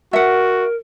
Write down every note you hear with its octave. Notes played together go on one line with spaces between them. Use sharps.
F#4 A#4 E5 F#5